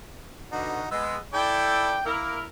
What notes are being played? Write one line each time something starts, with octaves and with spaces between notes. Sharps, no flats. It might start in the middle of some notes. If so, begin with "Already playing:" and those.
B2 D3 D#4 F#4
G#3 B3 E6
E4 A4 D5 G5
A#3 E4 A#4